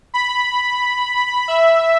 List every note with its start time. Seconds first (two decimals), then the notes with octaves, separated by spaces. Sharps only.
0.14 B5
1.48 E5